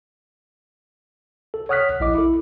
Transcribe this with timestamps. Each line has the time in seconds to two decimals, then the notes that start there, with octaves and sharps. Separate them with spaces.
1.54 A4
1.69 C#5 F#5 D#6 F6 F#6 B6
2.00 A#1 E4 D#5 D6
2.15 E4 A4